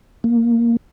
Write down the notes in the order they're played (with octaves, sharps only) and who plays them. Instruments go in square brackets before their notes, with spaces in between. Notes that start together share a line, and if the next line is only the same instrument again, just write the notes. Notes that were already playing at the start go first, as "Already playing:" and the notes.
[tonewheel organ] A#3